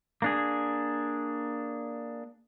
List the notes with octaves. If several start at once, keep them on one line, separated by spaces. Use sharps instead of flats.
A#3 D4 G#4